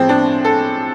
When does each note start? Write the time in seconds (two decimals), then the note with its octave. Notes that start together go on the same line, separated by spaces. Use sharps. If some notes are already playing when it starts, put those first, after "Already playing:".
Already playing: A2 F3 G#3 C4
0.09 D4
0.45 A4